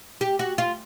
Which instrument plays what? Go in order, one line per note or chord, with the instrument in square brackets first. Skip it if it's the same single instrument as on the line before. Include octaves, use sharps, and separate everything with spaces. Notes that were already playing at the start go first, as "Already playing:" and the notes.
[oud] G4
F#4
F4